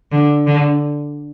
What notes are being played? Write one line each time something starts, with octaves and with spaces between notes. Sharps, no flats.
D3
D3